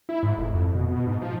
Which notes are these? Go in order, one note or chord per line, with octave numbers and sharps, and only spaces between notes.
E4
G#2
F1
F2
B2
B2
G#2
F3